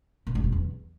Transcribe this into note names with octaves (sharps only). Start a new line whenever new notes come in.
A#2
A2
C3
E2